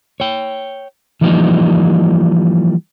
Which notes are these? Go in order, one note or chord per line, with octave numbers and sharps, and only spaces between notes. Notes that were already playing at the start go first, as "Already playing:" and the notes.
C#5 G5
E3 F3 G3 A#3 D#4